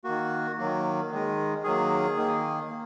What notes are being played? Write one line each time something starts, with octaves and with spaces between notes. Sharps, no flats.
D#3 A#3 F#4
D#3 F#3 A#3
D#3 G#3
D#3 F#3 A#3 G#4
D#3 A#3
A#3